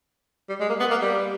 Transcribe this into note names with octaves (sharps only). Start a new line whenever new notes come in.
G3
G#3
A#3
B3
A#3
G3